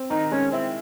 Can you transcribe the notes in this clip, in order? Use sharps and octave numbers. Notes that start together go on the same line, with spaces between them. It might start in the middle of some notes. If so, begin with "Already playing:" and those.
Already playing: C4
D#3 D#4
G#3 C#4
C4 E4